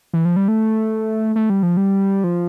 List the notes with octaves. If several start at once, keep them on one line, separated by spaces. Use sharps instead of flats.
E3
F3
G3
A3
A3
G3
F3
G3
F3